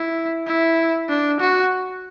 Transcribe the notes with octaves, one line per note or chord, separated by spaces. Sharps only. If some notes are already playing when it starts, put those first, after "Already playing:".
Already playing: E4
E4
D4
F#4